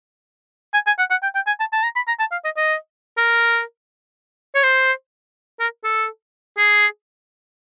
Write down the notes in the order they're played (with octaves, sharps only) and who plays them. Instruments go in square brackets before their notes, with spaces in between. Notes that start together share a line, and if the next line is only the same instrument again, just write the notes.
[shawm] G#5
G#5
F#5
F#5
G5
G5
G#5
A5
A5
A#5
B5
A#5
A5
F5
D#5
D#5
A#4
C#5
C5
A#4
A4
G#4